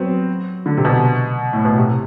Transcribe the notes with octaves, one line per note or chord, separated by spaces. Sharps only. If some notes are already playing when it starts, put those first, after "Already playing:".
Already playing: F#3 B3 C4
D3
C3
B2
A2
B2
C3